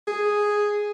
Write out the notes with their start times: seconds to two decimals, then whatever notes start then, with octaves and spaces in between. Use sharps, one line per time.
0.07 G#4